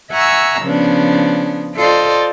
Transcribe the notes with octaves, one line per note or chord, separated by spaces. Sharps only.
E5 F#5 G#5 A#5 C#6 E6
C#3 F3 B3 C#4 D4
F4 A4 C5 D5 D#5